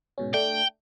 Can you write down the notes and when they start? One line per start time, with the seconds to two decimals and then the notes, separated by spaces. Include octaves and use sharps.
0.18 G#2 B2 C#4
0.34 A3 D4 G5